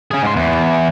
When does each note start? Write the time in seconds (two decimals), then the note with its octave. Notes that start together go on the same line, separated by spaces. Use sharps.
0.11 C#4 G#4
0.23 G#2 C6
0.36 E2